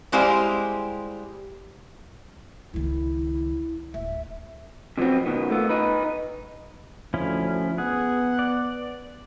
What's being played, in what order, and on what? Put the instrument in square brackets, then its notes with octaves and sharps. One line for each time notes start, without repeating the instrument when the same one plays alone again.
[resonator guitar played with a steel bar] G3 G#3 E4 G4 C5 F5
[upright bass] C#2 D#3 [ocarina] E4
[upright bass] D1 [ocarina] E5
[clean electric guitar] C3 F3 F#3 B3 C4
B2 D#3 B3
A3 B3 F4
D#4 B4
[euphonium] D2 [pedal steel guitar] F3 C#4 E4
[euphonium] B3 [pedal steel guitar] G#4 [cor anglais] F#5
[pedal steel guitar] D5